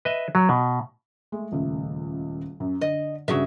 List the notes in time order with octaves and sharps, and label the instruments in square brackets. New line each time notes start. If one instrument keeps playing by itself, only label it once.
[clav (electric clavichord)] B4 D#5 E5
F#3
B2
[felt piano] G#3 A3
D#1 C#2 A3
F#2
[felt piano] D3 [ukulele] D#5
[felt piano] G2 C#3 [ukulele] F#4 G#4 E5